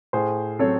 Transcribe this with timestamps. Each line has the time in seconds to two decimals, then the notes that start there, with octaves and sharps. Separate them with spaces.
0.13 A2 G#4 C5
0.59 F#3 C4 A4 C#5